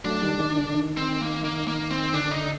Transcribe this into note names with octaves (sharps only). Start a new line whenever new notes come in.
F#3 A3 D4
D#3 G3
D#3
D3
D3
D#3
C4
A#3
A#3
A#3
C4
D3 D4
D#4